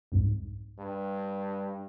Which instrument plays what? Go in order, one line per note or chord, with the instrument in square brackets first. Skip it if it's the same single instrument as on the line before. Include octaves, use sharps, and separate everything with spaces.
[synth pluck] C2 F2 G#2
[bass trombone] G2